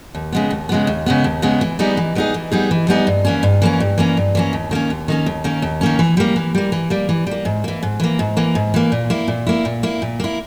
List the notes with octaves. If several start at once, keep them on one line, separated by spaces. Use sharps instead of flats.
D#2
C#3 G#3 B3
D#2
C#3 G#3 B3
D#2
C#3 G#3 B3
D#2
C#3 G#3 B3
E3
G3 B3 D#4 G#4
E3
G3 B3 D#4 G#4
E3
G3 B3 D#4 G#4
E3
G3 B3 D#4 G#4
G2
E3 A#3 C#4
G2
E3 A#3 C#4
G2
E3 A#3 C#4
G2
E3 A#3 C#4
D#2
D#3 A#3 C#4
D#2
D#3 A#3 C#4
D#2
D#3 A#3 C#4
D#2
D#3 A#3 C#4
E3
G3 A#3
E3
G3 A#3
E3
G3 A#3
E3
G3 A#3
G#2
E3 A#3
G#2
E3 A#3
G#2
E3 A#3
G#2
E3 A#3
A#2
A#3 E4
A#2
A#3 E4
A#2
A#3 E4
A#2
A#3 E4